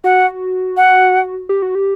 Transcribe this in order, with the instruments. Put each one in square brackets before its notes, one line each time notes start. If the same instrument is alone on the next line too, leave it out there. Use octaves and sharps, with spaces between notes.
[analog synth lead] F#4 [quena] F#5
[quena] F#5
[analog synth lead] G4
F#4
G4